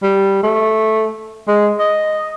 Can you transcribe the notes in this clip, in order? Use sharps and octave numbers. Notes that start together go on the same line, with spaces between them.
G3
A3
G#3
D#5